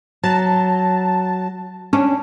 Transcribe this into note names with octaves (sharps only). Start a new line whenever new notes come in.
F#3 A5
C#4 D4